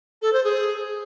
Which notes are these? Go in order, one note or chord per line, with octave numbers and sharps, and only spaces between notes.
A4
C5
G#4